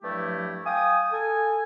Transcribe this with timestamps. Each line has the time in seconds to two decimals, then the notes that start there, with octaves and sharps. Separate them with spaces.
0.03 G2 F3 F#3 A3 E4 G4
0.65 F5 G5 G#5 D#6
1.12 A4 G#5